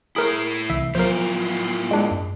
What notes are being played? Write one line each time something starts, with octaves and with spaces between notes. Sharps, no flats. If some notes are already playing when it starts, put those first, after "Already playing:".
A3 E4 G#4 A#4
C2 E3 E5
A2 F3 F#3 B3 F4 A#4 C5
G#3 D4
F#2